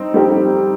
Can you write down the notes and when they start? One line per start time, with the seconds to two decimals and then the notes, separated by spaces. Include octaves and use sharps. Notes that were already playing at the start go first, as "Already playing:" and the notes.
Already playing: G3 C4 D#4
0.14 G3 C4 D#4 G4